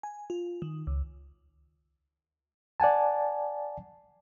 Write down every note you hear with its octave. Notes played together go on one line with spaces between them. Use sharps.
G#5
F4
D#3
C#2
D5 F#5 G#5 A5